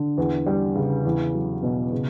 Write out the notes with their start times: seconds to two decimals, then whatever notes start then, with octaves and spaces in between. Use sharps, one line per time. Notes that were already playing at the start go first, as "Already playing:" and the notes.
Already playing: D3
0.18 E2
0.46 G3
0.75 C#3
1.05 E2
1.34 F#3
1.63 B2
1.93 C#3